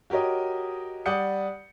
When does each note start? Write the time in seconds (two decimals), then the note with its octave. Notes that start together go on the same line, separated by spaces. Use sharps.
0.10 F#4 G4 A#4 C#5 D#5
1.06 G3 D5 F#5 D#6 G6 C#7